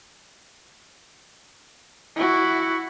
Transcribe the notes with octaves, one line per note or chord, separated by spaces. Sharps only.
E4 F#4